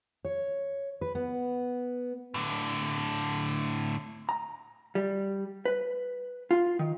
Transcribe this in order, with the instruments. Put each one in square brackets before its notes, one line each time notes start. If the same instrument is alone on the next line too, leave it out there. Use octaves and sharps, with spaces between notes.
[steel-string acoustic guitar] C#5
B4
B3
[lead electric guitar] A2 D3
[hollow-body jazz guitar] A#5
G3
B4
F4
D#3